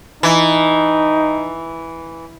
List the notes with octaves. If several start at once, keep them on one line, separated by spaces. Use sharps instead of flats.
E3 D#4